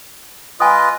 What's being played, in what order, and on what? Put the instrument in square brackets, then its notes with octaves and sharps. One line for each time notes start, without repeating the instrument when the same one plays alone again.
[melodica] F4 B4 D#5 [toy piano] G#5 D#6